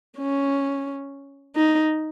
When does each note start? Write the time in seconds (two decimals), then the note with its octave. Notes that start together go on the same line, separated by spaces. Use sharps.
0.18 C#4
1.56 D#4